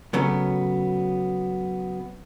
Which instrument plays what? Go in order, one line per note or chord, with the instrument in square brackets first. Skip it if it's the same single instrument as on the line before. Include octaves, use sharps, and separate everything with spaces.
[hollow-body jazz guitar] C#3 F#3 A3 B3 C#4